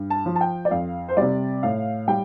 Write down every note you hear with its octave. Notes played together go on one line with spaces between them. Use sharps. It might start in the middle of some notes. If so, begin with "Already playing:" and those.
Already playing: G2
A5
F3
A5
G5
D5
F2 F5
C5
C3 G3 D5
A2 F5
G3 G5